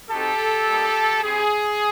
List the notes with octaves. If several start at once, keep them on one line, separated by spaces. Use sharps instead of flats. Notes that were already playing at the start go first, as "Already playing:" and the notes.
C4 D#4 F#4 G4 A4
G3 A#3 D#4
C4 E4 G4 G#4